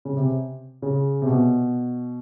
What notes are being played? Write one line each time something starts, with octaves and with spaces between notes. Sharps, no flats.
C#3
C3
C#3
C3
B2